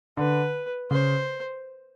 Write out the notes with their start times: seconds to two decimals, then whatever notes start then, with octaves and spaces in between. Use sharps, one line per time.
0.17 D3 B4
0.91 C#3 C5